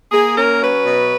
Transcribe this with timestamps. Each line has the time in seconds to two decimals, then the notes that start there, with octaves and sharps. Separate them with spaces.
0.11 A#3 G#4
0.36 C#4 A#4
0.61 F#3 B4
0.85 B2